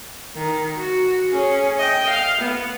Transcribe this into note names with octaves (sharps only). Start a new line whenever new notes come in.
D#3
F#4
C#4 G#4
D#5 G5
F5
B3